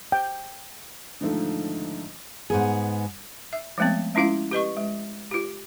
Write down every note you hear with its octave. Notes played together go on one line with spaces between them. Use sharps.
G5
G#2 D3 D#3 F3 A3
G#2 B3 G#4
E5
F3 G#3 A3 B3 C4
G#3 C#4 E4 F4 F5
G4 B4 D#5 C#6
G#3
F4 G4